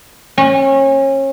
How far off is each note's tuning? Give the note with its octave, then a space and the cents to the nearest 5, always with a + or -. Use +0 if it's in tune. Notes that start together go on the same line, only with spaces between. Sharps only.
C#4 -30